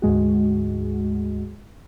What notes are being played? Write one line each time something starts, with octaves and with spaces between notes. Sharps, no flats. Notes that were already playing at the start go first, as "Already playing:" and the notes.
D2 G#2 G#3 F#4